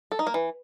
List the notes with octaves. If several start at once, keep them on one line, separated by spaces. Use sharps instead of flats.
A4
D#4
A#3
E3